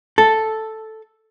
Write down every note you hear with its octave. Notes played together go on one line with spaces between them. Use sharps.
A4